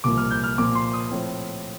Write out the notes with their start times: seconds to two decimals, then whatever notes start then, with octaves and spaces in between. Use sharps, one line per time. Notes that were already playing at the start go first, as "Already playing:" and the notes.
0.04 C2 A#2 F3 A#3 D6
0.17 F6
0.31 G6
0.44 F6
0.58 A#2 F3 A#3 D6
0.75 C6
0.93 D#6
1.11 A2 F3 C4